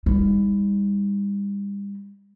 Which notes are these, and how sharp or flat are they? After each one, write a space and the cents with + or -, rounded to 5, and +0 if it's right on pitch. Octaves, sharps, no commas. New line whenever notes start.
G3 +40 D#4 +35